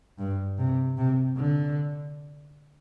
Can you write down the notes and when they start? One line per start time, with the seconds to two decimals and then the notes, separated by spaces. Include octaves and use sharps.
0.19 G2
0.58 C3
0.97 C3
1.37 D3